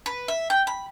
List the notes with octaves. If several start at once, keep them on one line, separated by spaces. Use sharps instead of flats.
B4
E5
G5
B5